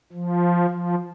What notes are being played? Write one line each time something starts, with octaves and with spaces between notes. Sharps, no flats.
F3
F3